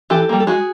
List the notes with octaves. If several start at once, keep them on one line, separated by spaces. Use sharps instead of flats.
E3 G4 A4
G3 A#3
A4
G#3 F#4 G#4